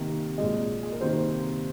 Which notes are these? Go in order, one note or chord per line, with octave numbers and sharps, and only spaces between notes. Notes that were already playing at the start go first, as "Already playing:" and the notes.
Already playing: C3 D#3 A#3
A#2 G#3 D#5
G#4
A#4
C3 D#3 A#3 C5